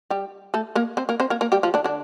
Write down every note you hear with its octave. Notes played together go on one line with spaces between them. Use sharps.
G3 G4
A3 A4
A#3 A#4
C4 C5
A#3 A#4
C4 C5
A#3 A#4
A#3 A#4
G3 G4
F3 F4
D3 D4
D3 D4